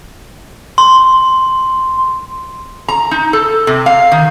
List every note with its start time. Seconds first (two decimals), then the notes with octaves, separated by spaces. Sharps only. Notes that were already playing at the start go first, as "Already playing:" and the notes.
0.78 C6
2.88 A#5
3.11 D#4
3.33 A4
3.67 C3
3.86 F5
4.12 D#3